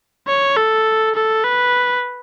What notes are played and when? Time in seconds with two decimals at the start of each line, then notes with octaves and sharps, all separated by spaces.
0.27 C#5
0.56 A4
1.15 A4
1.44 B4